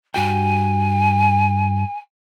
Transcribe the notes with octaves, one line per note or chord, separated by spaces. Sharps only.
G2 F#4 G5 G#5